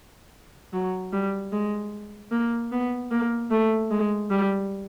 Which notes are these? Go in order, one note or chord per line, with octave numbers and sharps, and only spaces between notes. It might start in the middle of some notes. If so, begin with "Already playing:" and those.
F#3
G3
G#3
A#3
B3
A#3
A3
G#3
G3